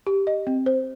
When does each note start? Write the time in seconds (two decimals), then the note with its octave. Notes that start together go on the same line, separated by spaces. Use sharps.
0.07 G4
0.27 D#5
0.47 C4
0.66 C5